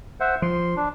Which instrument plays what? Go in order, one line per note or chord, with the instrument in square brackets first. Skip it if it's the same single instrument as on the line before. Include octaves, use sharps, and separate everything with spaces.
[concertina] C5 E5 F#5
[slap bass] F3 [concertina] C6
[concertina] D4